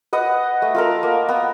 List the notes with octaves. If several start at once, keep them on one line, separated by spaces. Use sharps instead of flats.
B4 D#5 F#5
A3
F4 A4 A#4
A#3
B3